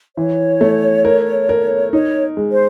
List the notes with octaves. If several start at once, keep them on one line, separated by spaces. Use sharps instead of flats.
E3 C#5
A3
A#4
A#4
D#4 C#5
G#3
C5